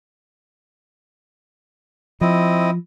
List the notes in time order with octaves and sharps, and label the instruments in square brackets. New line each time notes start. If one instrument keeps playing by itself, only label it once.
[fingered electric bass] F3 [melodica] C4 E4 D#5